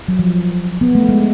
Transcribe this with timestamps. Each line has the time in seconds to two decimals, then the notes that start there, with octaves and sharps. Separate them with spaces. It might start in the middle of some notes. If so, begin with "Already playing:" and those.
0.08 F#3
0.19 F3
0.81 B3
0.95 A3
1.09 G#3